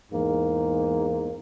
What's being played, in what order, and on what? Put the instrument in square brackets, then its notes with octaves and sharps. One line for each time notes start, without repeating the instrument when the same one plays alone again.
[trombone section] E2 G#2 A#3